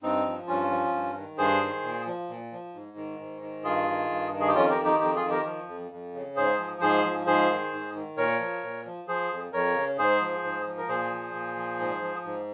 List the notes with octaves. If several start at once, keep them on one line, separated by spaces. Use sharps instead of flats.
G2 C4 D#4
F3
G2 C#4 F4
F3
G2
D#3
G2 G#4 C5
D#3
A#2
F3
A#2
F3
G#2
D#3
G#2
D#3
G2 F4 G#4
D#3
G2
D#3
G#4
G4
F2 C#4 F4
G4 A#4
D#3
D#4 G4
F2 D#4 G4
F4 G#4
D#3
G4 A#4
F3
F2
F2
C#3
G#2 G#4 C5
F3
G#2 G#4 C5
F3
G#2 G#4 C5
D#3
G#2
D#3
A#2 A#4 C#5
F3
A#2
F3
F3 G#4 C5
F2
F2 A#4 C#5
C#3
G#2 G#4 C5
F3
G#2
F3
A#4
A#2 G#4 C5
F3
A#2
F3
G#2
F3
G#2